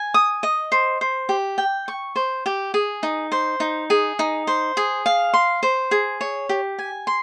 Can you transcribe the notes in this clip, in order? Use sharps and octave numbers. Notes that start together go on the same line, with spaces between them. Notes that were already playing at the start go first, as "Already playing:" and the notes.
Already playing: G#5
D#6
D#5
C5
C5
G4
G5
C#6
C5
G4
G#4
D#4
C5
D#4
G#4
D#4
C5
G#4
F5
C6
C5
G#4
C#5
G4
G#5
C6